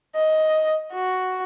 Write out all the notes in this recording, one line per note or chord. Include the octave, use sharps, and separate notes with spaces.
D#5
F#4